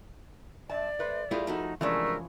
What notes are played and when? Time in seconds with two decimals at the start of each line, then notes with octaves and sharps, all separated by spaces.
0.70 G2 D5 E5 A5
0.99 A3 B4 C5
1.31 G3 A3 E4 F4 G#4 A#4
1.47 F3 A3 D#4 F#4
1.81 C2 E3 F3 G#3 A3 C#4 D4 A#4